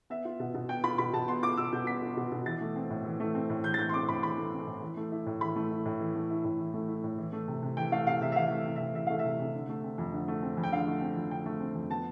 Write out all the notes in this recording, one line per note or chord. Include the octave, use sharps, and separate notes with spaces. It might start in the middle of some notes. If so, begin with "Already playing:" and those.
B3 E5
F4
B2
B2
B3 G5
F4 B5
B2 B5
B2 A5
B3 C6
F4 D6
B2 E6
B2 G6
B3 B6
F4
B2
B2
E3 A6
A3
C4
A2
E3
A3
C4
A2
E3 G6
A6
A3 G6
C6
C4 D6
A2 B5
E3 B5
A3
C4
A2
E3
A3
E4
A2
E3 B5
A3
E4
A2
E3
A3
E4
A2
E3
A3
E4
A2
E3
A3
C3
C3
E3 G5
A3 F5
C3 F5
C3 E5
E5
E3 F5
A3
C3
C3 E5
E3 E5
A3 F5
E5
C3
C3
D3
A3
C4
F2
D3
A3
C4
F2
G5
D3 F5
A3
C4
F2
D3 G5
A3
C4
F2
B3 A5